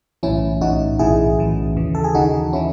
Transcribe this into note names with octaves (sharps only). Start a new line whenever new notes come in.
B1 A2 E3 C#4 E4
B1 A2 E3 D#4 F#4
B1 A2 E3 E4 G#4
B1 A2 E3
D#2 C#3 E3
A4
G#4
D#2 C#3 E3 D#4 F#4
C#3 E3 C#4 E4